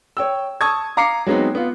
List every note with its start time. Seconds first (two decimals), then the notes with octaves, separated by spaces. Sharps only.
0.17 C#5 G5 E6
0.61 A5 C#6 D#6 E6 G#6
0.97 F5 A#5 D6 C7 C#7
1.26 F#3 G#3 B3 C4 D#4
1.55 B3 F4